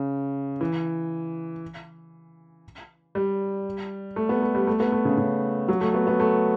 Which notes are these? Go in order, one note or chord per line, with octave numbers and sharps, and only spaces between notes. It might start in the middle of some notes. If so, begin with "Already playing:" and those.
Already playing: C#3
E3
G3
A3
B3
A3
G3
A3
B3
A3
C#3
C#3
F#3
A3
B3
B3
A3